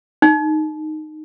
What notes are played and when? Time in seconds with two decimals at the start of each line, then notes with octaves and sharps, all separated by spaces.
0.22 D#4